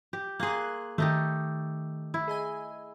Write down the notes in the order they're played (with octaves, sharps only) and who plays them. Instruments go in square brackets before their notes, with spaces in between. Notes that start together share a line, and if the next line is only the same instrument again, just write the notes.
[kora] G4
[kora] A#3 G#4 [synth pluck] C6 F#6
[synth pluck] D#3 [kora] A3 D#4 G4
[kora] E4
[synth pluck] G#4 D#5 G#5